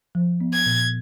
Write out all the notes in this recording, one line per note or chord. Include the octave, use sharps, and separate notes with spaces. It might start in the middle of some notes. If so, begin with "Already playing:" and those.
F3
B3
G#6
A#2